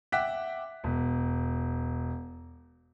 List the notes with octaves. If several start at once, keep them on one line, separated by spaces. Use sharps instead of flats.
E5 F#5 G5 D6 F#6 B6
E1